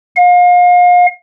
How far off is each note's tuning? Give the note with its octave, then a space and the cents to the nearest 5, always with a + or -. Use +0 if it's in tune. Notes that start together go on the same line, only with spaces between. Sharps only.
F5 +35